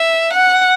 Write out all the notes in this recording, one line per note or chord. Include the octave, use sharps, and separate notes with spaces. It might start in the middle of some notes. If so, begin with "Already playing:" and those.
Already playing: E5
F#5